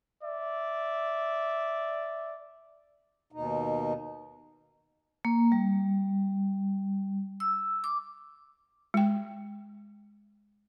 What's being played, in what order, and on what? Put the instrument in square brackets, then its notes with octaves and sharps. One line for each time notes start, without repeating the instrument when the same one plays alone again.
[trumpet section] D5 E5
[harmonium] D#2 B2 D#4
[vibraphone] A#3
G3
E6
D6
[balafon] G#3 G5